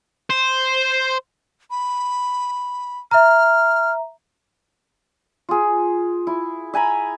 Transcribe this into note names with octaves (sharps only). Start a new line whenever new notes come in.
C5
B5
E5 A#5 F6
F4 G#4
E4
E5 G#5 A#5 B5